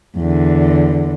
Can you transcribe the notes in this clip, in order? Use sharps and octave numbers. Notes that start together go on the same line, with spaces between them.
E2 D3